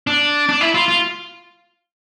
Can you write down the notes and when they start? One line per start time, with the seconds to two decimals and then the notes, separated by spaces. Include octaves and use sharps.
0.07 D4
0.49 D4
0.61 E4
0.74 F4
0.88 F4